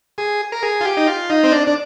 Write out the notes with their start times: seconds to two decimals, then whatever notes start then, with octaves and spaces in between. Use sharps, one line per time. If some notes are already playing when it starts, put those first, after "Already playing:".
0.18 G#4
0.52 A#4
0.62 G#4
0.81 F4
0.85 G4
0.97 D#4
1.07 F4
1.30 D#4
1.44 C4
1.52 D4
1.67 D4